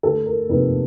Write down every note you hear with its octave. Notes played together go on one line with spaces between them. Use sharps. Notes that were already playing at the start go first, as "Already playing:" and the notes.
D2 A4
A#4
C3 F3 A#3 D#4 B4